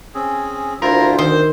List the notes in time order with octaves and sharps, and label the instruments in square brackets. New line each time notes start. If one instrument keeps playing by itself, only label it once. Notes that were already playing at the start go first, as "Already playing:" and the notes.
[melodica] C4 C#4 G#4
[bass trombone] D2 [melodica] E4 F4 C5 [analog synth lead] A#4
[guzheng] D#3 [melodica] C4 [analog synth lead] C5